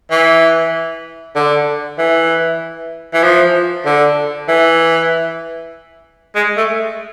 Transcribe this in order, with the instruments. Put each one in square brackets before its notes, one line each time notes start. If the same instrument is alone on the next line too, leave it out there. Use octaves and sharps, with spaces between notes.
[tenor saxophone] E3
D3
E3
E3
F3
D3
E3
G#3
A3